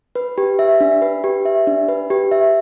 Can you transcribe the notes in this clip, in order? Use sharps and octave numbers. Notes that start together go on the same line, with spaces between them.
B4
G4
E5
D4
B4
G4
E5
D4
B4
G4
E5